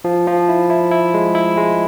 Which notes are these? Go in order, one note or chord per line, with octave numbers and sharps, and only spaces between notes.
F3
F3
E4
E4
E4
G#3
E4
G#3